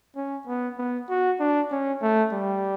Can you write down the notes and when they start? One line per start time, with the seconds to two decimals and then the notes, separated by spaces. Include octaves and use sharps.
0.16 C#4
0.47 B3
0.78 B3
1.09 F#4
1.40 D4
1.71 C#4
2.02 A3
2.32 G3